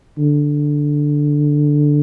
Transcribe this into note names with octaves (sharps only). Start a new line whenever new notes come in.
D3